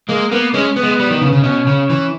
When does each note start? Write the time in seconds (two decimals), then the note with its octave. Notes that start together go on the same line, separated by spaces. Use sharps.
0.09 G#3 A#3
0.31 A#3 B3
0.54 G#3 C#4
0.76 B3
0.83 G#3
0.99 G3
1.10 D#3
1.22 C#3
1.33 C#3
1.44 B2 C#4
1.67 C#3
1.90 E3